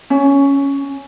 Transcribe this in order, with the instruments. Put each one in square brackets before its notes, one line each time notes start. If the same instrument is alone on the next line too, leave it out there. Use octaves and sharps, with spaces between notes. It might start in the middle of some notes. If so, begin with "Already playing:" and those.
[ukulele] C#4